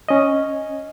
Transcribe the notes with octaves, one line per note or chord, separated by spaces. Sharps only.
C#4 D#5